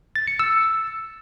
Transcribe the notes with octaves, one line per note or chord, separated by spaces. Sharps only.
A6
C#7
E6